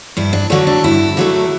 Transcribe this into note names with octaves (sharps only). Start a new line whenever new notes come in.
G2 E4
D4
D3 F#3 A3 D4
D4
G2 E4
D3 F#3 A3